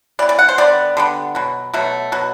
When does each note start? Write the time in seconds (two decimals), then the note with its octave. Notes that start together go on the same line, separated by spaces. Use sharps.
0.19 E3 G3 B3 D5
0.29 D5
0.39 F#5
0.49 C5
0.58 D3 G3 B3 D5
0.97 D3 G3 B3
1.35 B2 F#3
1.74 B2 F#3 A3
2.12 B2 F#3